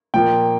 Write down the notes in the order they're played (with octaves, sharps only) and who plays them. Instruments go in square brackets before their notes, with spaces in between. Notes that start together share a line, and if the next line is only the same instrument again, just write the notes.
[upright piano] A#2 F3 A#3 G5